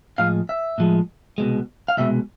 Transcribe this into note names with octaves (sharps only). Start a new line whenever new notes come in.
A2 F3 G#3 F5
E5
A2 F3 G#3
C2 B2 G#3
F5
C2 B2 G#3 E5